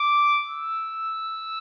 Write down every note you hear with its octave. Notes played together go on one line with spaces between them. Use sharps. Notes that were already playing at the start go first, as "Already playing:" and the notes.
Already playing: D6
E6